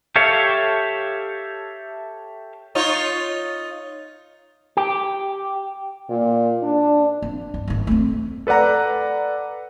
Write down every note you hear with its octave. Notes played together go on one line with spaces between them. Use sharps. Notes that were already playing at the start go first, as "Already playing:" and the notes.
G4 A4 C#5 E5 F5
D#4 F4 C#5
G4
A#2
D4
C4
G2
G#1 D#3
A3 C4
A4 B4 D5 F#5 A#5